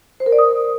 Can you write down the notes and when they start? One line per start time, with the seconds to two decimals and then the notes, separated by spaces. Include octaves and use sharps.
0.20 C5
0.26 A#4
0.32 D5
0.39 D#6